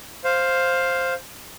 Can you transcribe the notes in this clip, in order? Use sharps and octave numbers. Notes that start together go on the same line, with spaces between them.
C5 F5